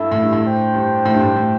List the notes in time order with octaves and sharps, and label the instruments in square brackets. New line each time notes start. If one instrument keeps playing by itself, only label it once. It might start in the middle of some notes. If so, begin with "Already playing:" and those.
Already playing: [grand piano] G2 [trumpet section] E4 A4 E5
[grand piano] A2
G2
A2
[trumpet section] D4 C5 G5
[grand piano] G2
A2
G2
A2
A2